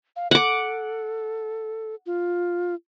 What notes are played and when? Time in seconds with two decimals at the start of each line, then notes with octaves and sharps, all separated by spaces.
0.16 F5
0.31 A4 F#5 D6
2.06 F4